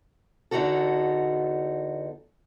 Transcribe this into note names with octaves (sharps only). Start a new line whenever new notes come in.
E2 G2 D3 D#4 F#4 A4